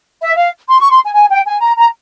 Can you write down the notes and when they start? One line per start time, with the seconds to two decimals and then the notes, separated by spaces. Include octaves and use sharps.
0.22 E5
0.37 F5
0.68 C6
0.79 C#6
0.91 C6
1.03 G#5
1.14 G#5
1.29 G5
1.46 G#5
1.61 A#5
1.76 A#5